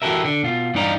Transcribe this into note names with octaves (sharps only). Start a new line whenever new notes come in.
E3 F#4 G4 A4 A#4 E5
D3
B2 F4
G2 E3 D#4 D5 F5 A#5